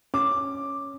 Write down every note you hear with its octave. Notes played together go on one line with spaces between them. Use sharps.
C#4 D6